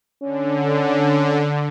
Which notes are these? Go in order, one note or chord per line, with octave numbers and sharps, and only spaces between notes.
D3 C#4